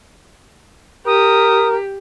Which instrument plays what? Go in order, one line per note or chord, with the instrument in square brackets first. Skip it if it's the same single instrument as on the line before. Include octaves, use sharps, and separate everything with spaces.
[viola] G4 [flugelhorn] A#4 [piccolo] D#6